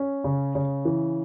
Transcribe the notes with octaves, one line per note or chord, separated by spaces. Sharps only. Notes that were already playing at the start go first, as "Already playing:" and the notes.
Already playing: C#4
C#3
C#3
E3